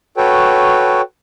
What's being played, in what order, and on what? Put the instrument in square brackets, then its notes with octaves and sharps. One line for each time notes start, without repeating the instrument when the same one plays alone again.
[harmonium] F#4 A4 B4 C#5 G5